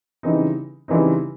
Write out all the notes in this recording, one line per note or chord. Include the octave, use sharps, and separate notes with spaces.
C#3 E3 G3 C4 D#4
C#3 E3 G3 C4 D#4